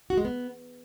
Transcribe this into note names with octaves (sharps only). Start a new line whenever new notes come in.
F#4
G#3
B3